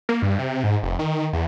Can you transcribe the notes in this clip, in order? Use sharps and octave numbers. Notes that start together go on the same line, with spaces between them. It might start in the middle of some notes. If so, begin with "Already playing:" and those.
A#3
G2
C3
G#2
F1
D#3
E2